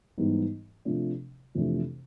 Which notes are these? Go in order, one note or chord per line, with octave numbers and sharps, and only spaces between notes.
G#2 E3 G3 B3 D#4
C3 F3 A3 D4
F2 C3 E3 A3 D4